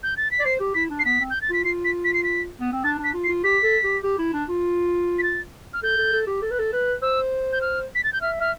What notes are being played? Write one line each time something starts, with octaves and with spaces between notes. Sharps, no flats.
G6
A6
B6
D5
C5 C7
G4
E4 B6
D4
C7
B3 B6
C4
G6
A6
F4 B6
F4 C7
B6
B6
C7
B6
B3
C4
D4 A6
D4 B6
F4
C7
F4
G4 B6
A4
G4
G4
E4
D4
F4
B6
A6
F6
A4 G6
A4
A4
G4
A4
B4
A4
B4
C5 E6
G6
F6
B6
A6
G6
E5 F6
E5 F6